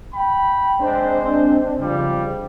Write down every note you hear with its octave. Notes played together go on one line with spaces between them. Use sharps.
G5 B5
G#3 C4 D4 C5
C#3 F3 G3